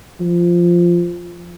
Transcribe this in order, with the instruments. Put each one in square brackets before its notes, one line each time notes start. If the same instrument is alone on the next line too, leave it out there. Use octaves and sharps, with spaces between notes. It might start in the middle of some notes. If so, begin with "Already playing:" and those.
[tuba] F3